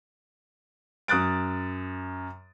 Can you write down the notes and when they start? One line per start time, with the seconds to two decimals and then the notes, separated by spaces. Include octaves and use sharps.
1.08 F#2 D#6 F#6 A6 D7